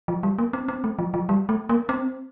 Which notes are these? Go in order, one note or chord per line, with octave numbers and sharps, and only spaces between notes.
F3
G3
A#3
C4
C4
A3
F3
F3
G3
A3
A#3
C4